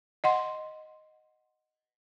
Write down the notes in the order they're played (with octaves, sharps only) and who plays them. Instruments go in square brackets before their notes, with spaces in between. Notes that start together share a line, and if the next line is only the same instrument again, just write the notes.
[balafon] D#5 F#5 C6